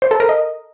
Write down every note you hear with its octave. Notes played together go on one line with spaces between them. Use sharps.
C5
A4
A#4
D#5